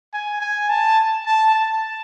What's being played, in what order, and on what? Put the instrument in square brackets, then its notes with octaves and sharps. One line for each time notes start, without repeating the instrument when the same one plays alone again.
[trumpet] G#5
G#5
A5
A5
A5